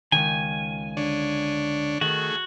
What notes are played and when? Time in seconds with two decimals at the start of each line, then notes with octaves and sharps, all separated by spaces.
0.12 C#2 D#3 G#5
0.97 D3 D4 C#5
2.01 D#3 A3 F#4 G#4